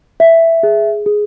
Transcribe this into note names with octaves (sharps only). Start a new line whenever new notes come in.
E5
G#4
G#4